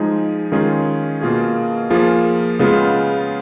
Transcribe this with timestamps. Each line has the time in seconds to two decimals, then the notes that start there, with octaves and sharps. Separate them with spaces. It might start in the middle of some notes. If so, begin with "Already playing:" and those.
Already playing: F3 G#3 D#4 G#4
0.52 D#3 G#3 C#4 F4 G#4
1.21 B2 A#3 F4 G#4
1.90 F3 A#3 F4 G#4
2.59 C#3 G#3 B3 F4 G#4